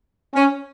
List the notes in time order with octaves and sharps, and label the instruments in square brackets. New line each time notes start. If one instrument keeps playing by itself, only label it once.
[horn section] C#4